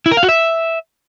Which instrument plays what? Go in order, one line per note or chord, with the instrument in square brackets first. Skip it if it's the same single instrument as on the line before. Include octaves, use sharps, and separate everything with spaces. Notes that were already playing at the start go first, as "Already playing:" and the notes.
[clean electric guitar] E4
A#4
F5
F#4
E5